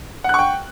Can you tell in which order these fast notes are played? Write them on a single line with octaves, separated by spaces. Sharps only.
F#5 F#6 C#6 G5